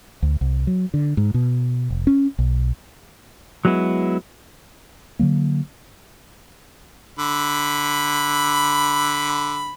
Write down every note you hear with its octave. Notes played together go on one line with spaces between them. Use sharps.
D2
C2
F#3
D3
G#2
B2
F1
C#4
B1
F#3 G#3 B3 E4
D3 D#3 F#3 A#3
D3 B5